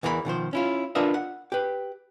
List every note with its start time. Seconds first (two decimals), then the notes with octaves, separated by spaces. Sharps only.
0.03 E2 E3 A#4 D#5 B5
0.25 B2 D#3 F3 C5
0.53 C#4 E4 F4
0.95 D4 F4 A#4 B4 D#5 E5
1.14 F#5
1.52 G4 B4